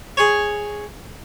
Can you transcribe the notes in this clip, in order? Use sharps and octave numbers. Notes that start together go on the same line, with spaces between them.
G#4 C#5